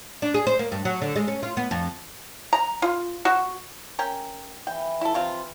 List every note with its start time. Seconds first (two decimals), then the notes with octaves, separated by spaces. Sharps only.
0.22 D4
0.34 G#4
0.47 C5
0.59 A#3
0.72 G2
0.85 F#3
1.02 D3
1.16 G#3
1.28 C#4
1.43 F4
1.57 B3
1.71 F2
2.53 A#5
2.82 F4
3.25 F#4
3.99 C#4 A#4 G5
4.67 E3 G5
5.01 E4 A4
5.14 C3 C4 F4